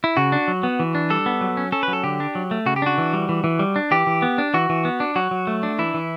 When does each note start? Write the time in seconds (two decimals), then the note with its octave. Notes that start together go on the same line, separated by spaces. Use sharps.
0.04 E4
0.17 C#3 F#4
0.32 D4
0.48 F#3
0.63 B3
0.80 E3
0.95 D4
1.10 G3 A4
1.26 B3
1.41 F#3
1.57 C#4
1.72 C#4 A4
1.83 B4
1.88 F#3
1.93 A4
2.04 D3 G4
2.20 D4
2.35 F#3
2.51 A3
2.66 C#3 F#4
2.76 G4
2.82 D4 F#4
2.98 E3
3.13 G3
3.29 E3
3.44 E3
3.59 G3
3.76 D4
3.91 E3 G4
4.07 E3
4.22 B3
4.38 D4
4.54 E3 F#4
4.69 E3
4.85 B3
5.00 D4
5.16 F#3 F#4
5.31 F#3
5.47 A3
5.63 D4
5.79 E3 E4
5.94 E3